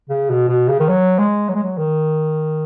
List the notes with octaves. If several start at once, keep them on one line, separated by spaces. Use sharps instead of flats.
C#3
B2
B2
C#3
D#3
F#3
G#3
F#3
G#3
F#3
D#3